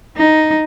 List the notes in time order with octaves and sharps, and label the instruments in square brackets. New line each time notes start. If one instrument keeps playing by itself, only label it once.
[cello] D#4